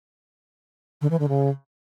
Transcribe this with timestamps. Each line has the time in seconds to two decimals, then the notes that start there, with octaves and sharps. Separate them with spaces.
1.01 D3
1.10 E3
1.19 D3
1.28 C#3